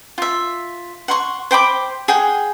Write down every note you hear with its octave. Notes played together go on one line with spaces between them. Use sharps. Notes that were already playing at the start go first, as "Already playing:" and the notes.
F4 E5
F#5 C6 C#6
C5 G5 B5 D6
G#4 F#5 G5